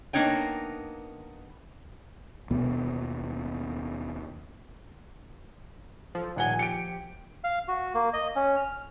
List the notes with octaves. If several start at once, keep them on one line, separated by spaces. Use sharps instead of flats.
A#3 B3 D4 D#4 C#5 G5
D#2 B2 B3
F3 A4
D#1 F#5 G#5 G7
G4 C#7 D7
F5
F#4
A#3
D#5
C#4
F6